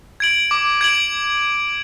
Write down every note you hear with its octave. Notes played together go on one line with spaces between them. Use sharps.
G#6 D7 F#7
D6
G#6 D7 F#7